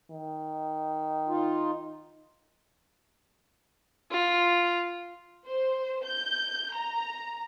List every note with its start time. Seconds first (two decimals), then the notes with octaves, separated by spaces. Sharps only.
0.11 D#3
1.28 D#4 F4
4.11 F4
5.47 C5
6.05 G6
6.76 A#5